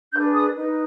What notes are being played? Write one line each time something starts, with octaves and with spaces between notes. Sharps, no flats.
D4 G#4 B4 G6
D#6
D#4 B4